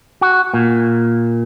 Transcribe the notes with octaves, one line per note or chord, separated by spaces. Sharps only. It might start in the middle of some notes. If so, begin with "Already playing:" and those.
F#4
A#2